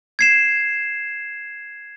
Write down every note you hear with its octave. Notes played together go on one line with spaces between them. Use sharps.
G#6 C7 E7